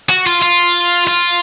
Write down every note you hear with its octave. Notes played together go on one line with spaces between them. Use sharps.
F#4
F4
F4
F4